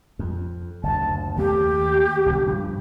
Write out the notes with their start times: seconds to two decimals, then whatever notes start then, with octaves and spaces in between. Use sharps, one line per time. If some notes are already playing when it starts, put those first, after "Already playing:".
0.19 F2
0.83 F#1 D2 A5
1.38 D#2 A3 A#3 G4
2.26 C2 B2 D3
2.46 G2 C#3 F3